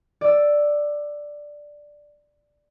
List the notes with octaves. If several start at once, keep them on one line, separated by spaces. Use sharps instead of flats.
D5 E6